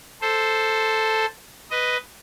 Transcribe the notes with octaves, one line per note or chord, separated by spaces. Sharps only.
A4 C5
B4 D#5